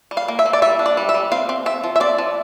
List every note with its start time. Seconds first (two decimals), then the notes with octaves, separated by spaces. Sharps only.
0.11 G3
0.17 F5
0.28 A#3
0.39 E5
0.46 A#3
0.53 D5
0.62 G3 E5
0.79 D4
0.86 D5
0.97 G3
1.09 E5
1.14 G3
1.32 C4 F5
1.49 C4
1.66 C4 E5
1.84 F3
1.96 E5
2.00 C4 D5
2.18 F3